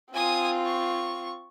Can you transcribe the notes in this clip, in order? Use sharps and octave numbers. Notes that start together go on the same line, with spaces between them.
C4 F4 G#5 D#6
C#6